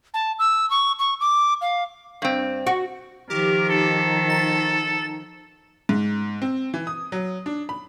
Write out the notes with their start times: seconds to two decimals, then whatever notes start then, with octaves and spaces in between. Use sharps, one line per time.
0.14 A5
0.39 E6
0.70 C#6
0.99 C#6
1.21 D6
1.61 F5
2.22 G2 C4
2.67 F#4
3.30 D#3 F3 G4 A#4
3.69 D#4 A4
4.30 A6
5.89 G#2
6.42 C4
6.74 E3
6.87 D#6
7.12 F#3
7.46 D4
7.69 B5